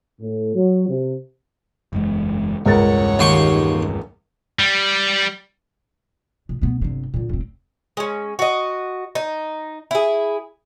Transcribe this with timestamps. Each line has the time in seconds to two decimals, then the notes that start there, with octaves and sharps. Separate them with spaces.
0.21 A2
0.54 F#3
0.89 C3
1.93 F#1 E2 G#3
2.66 E1 C#2 G2 A#4 C#5 F#5 A6
3.19 D#2 C6 C#6
4.59 G3
6.49 B2
6.61 B2 B3
6.82 G1 C3
7.14 A#2 D3
7.29 E1 C4
7.97 G#3 C#4
8.39 F#4 D#5
9.15 D#4
9.91 E4 G#4